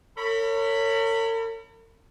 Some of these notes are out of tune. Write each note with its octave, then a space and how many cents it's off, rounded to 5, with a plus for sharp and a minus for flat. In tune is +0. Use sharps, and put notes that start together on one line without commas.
A#4 -45 C#5 +0 B5 +0